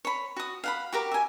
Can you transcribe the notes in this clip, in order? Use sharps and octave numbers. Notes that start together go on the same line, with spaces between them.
C#5 B5
F#4 D#6
F5 F#5 B5
F#4 G4 A#4 D6
E5 G#5